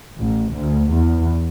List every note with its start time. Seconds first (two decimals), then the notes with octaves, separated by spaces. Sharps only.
0.18 A1
0.53 D2
0.95 E2